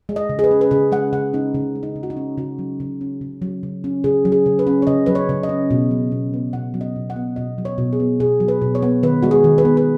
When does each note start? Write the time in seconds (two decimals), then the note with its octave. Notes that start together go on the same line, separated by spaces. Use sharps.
0.09 G#3
0.16 D#5
0.29 C#3
0.39 G#4
0.44 B4
0.51 C#4
0.61 B4
0.71 C#3 G#4
0.92 G#3 F#5
1.13 C#3 F#5
1.33 C#4 D#4
1.54 C#3
1.75 G#3
1.83 D#4
1.96 C#3
2.03 F#4
2.10 D#4
2.17 C#4
2.38 C#3 F#4
2.59 F#3
2.80 C#3
3.01 C#4
3.21 C#3
3.42 F#3
3.63 C#3
3.84 C#4
4.04 C#3 G#4
4.25 F#3
4.32 G#4
4.46 C#3
4.59 B4
4.67 C#4
4.82 C#5
4.87 C#3 D#5
5.06 F#3 B4
5.15 C#5
5.29 C#3
5.43 D#5
5.49 C#4
5.71 B2
5.91 F#3
6.12 B2
6.34 B3
6.53 B2 F#5
6.74 F#3
6.81 D#5
6.96 B2
7.10 F#5
7.16 B3
7.36 B2 D#5
7.58 F#3
7.65 C#5
7.78 B2
7.93 G#4
8.00 B3
8.20 B2 G#4
8.40 F#3
8.48 B4
8.62 B2
8.75 C#5
8.82 B3
9.03 D#3 B4
9.22 G#3 F#4
9.31 G#4
9.44 D#3
9.58 B4
9.65 B3
9.77 B4